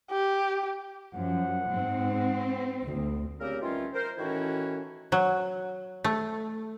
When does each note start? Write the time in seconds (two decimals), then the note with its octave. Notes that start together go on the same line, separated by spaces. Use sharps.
0.11 G4
1.14 F#2 F3 F#5
1.71 G#2 C4
2.82 D2
3.40 A#2 C#3 C4 G4 A#4
3.62 D#3 E3 G3 C#4 F4
3.93 A#4 C5
4.18 A2 D#3 E3 C#4 E4 F#4
5.12 F#3
6.04 A3